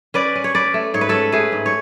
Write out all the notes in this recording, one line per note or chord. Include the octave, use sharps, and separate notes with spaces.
C#4 B4 D5
C#4
C#5
C#4 B4 D5
A3
G#2 C#5
B4
C#4 A4 C#5
A3 G#4 B4
G#2
C#5